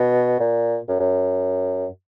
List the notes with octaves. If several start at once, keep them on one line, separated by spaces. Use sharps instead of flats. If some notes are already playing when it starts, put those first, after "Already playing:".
Already playing: B2
A#2
F#2
F#2